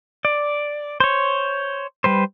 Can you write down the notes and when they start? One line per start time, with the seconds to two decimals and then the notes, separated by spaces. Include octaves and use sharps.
0.25 D5
1.00 C5 C#5
2.04 G3 B4 C5